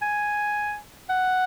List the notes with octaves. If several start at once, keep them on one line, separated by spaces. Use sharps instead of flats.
G#5
F#5